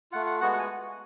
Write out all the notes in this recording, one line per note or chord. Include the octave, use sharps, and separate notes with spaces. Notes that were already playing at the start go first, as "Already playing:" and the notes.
A3 F4 F#5
F#5
G#3 B3 F#4 F#5
F#5
G#5